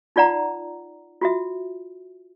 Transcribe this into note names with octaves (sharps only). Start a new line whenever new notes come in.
D#4 F4 D5 F#5 A#5
F4 F#4 E5